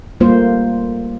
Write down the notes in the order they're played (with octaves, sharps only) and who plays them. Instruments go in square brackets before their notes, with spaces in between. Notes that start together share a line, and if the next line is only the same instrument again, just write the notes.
[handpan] G3 A3 A#3 F4 C5